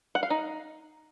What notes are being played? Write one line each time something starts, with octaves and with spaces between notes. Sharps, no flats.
F#5
F5
D#4